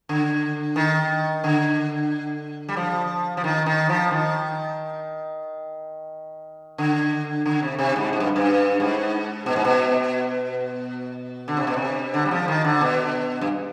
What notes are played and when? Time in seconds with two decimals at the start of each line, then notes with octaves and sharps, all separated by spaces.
0.09 D3
0.76 D#3
1.44 D3
2.69 G3
2.76 F3
3.37 F3
3.44 D#3
3.66 D#3
3.89 F3
4.11 D#3
6.78 D3
7.46 D3
7.63 C3
7.79 C3
7.96 G#2
8.13 G#2
8.20 G2
8.36 G2
8.80 G#2
9.46 B2
9.56 G#2
9.65 B2
11.48 D3
11.57 C3
11.67 B2
11.76 C3
12.14 D3
12.25 G3
12.31 F3
12.48 D#3
12.65 D3
12.81 B2
13.41 G2